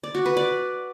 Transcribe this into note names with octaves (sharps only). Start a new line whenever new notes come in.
D5
F#4
B4
D5